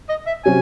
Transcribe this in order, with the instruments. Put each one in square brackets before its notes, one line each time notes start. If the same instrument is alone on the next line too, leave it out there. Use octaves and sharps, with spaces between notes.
[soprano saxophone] D#5
E5
[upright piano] C3 F#3 C#4 [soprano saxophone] G#5